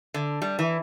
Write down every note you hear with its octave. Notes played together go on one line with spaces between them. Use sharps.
D3
G3
E3